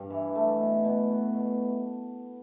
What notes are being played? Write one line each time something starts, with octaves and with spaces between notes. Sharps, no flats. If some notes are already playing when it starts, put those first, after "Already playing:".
Already playing: G2
E3
A3
B2
B2
B2
B2